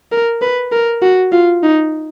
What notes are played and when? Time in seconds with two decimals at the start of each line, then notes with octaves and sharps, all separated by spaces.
0.12 A#4
0.42 B4
0.72 A#4
1.02 F#4
1.32 F4
1.63 D#4